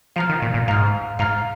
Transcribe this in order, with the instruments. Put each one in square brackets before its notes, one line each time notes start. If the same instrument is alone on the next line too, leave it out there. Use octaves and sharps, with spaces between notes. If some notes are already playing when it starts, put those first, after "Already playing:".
[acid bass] F3 [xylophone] F5 A#5 F6
[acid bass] D#3
A#2
A#2
[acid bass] G#2 [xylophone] F5 A#5 F6
[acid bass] G#2 [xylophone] F5 A#5 F6